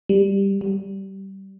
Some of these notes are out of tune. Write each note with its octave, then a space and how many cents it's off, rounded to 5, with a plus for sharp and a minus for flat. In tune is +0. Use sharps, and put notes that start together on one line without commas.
G3 +10
G3 -20